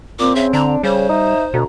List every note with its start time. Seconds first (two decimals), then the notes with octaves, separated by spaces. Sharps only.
0.19 A#2 C4 D6
0.35 C#3 E5
0.53 D3 D4 A#5
0.83 C#3 G3 C5
1.09 D#4 E5
1.54 D2 B2 A#5